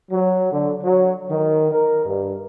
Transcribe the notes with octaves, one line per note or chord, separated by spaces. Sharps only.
F#3
D3
F#3
D#3
A#4
G2